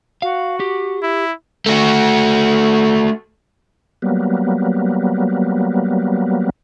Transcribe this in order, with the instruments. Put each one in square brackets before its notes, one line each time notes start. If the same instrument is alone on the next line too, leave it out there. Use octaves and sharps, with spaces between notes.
[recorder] F#4 [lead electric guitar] F5
[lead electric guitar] G4
[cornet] E4
[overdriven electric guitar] A3 F#4
[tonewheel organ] F#3 G3 A#3 B3